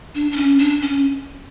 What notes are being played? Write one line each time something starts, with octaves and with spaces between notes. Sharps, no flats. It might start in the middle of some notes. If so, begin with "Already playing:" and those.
D4
D4
C#4
D4
C#4